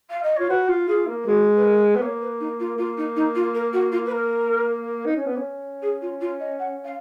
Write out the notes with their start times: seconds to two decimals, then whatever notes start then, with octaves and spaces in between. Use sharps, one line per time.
0.10 F5
0.23 D#5
0.36 F4 C#5
0.50 F#4 B4
0.69 F4
0.88 F4 G#4
1.07 A#3
1.26 G#3 F#4
1.56 B4
1.64 A#4
1.96 B3
2.02 A#3 C#5
2.21 B4
2.40 D#4
2.60 F4
2.78 A#3 F4
2.97 D#4
3.16 D#4
3.35 F4
3.54 A#4
3.73 F#4
3.92 F4
4.06 B4
4.11 A#4
5.06 D#4
5.17 C#4
5.26 B3
5.37 C#4
5.82 G#4
6.01 F4
6.21 F4
6.40 D#5
6.59 F#5
6.84 F5